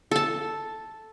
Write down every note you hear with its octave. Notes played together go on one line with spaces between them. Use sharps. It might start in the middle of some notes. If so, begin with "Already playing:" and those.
A4 A5